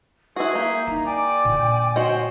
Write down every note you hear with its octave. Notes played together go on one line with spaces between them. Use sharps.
E4 F#4 G#4 B4
A#3 E5 G6
D#4 E4 A#5
D5 G5 G#5
A#2 D3
F#4 C5 C#5 D#5